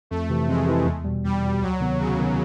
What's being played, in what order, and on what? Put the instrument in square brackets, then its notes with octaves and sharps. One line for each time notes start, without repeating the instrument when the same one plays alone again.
[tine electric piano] F2 [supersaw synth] A3
[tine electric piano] C3 E3
[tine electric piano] F2 [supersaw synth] G#3
[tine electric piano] C3 E3
E2
B2 G3
[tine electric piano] E2 [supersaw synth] G3
[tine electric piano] B2 G3
[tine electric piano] D2 [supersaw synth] F#3
[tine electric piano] C3 D#3 F#3 B3
[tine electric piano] D2 [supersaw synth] C#3
[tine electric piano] C3 D#3 F#3 B3